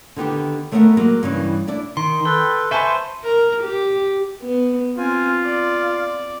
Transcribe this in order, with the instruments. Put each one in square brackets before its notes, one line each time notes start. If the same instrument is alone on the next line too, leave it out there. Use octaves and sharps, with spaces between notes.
[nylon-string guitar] D3 D#3 B3 G4
D#3 A3 B3 A#4 C5 F#5
F#3 G#3 A#3
G2 C#3 E3
D4 E4 D5
[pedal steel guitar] D#3 [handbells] C6
[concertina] A4 B4 [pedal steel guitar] G5
[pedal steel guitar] B4 C5 [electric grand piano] E5 G#5 A5 [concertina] C#6
[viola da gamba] A#4
G4
[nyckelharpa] B3
[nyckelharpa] C4 G#5 [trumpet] F4
[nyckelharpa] D5